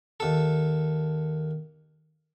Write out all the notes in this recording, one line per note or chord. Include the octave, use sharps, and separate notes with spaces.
D#2 A4